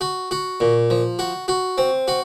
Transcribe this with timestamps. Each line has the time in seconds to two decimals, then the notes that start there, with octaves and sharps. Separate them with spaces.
0.01 F#4
0.31 F#4
0.60 A#2
0.90 F3
1.19 F#4
1.48 F#4
1.78 C4
2.08 F#4